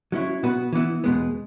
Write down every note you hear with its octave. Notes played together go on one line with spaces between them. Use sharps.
F#3 C#4 E4 C#5
B2 B3 F#4 B4
E3 B3 E4
E2 B2 G#3 B3